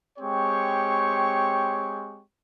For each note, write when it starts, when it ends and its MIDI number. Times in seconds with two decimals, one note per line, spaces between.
0.19 2.22 56
0.19 2.22 60
0.19 2.22 67
0.19 2.22 73
0.19 2.22 85